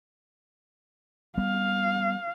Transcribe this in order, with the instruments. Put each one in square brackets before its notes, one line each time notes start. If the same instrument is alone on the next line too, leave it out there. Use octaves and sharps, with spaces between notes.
[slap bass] G3 B3 [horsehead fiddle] F5